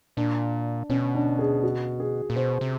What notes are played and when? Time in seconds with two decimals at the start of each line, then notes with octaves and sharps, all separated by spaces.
0.17 A#2 D4
0.90 B2 C#4
1.15 D4
1.39 G#4
1.64 F#4
2.00 G#4
2.30 A#2
2.36 B2 C5
2.61 C3